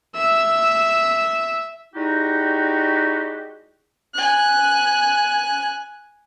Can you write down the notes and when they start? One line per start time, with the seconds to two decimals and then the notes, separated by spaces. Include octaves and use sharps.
0.15 E5 E6
1.94 G3 G#3 D#4 E4 F#4 G4
4.14 G#5 F#6